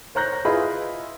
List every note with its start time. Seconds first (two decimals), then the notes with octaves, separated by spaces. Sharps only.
0.15 C5 C#5 A#5 F#6 G6 A#6
0.45 E4 F4 G#4 B4 D#5 B5